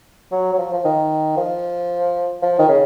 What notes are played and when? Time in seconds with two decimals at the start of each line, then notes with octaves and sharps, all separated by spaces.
0.32 F#3
0.53 F#3
0.58 F3
0.74 F3
0.85 D#3
1.37 F3
2.42 F3
2.59 D#3
2.68 C#3